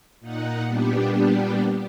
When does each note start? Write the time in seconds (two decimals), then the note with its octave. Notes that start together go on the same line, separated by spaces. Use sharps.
0.20 A#2 D#4 F#5
0.66 A#2 G3 B3 D4 G4